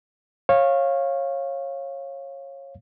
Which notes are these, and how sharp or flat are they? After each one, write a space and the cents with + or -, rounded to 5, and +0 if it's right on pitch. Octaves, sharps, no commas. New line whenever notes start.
C#5 -20 F5 +0